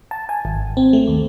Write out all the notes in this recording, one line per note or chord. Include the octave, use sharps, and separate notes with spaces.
A5
G#5
G#1
C4
A3
D#2